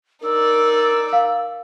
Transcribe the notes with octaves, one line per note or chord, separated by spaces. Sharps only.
D#4 A#4 D5 E6
F5